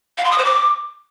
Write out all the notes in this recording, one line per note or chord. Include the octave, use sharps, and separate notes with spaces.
F5
C6
D#6
C5
D6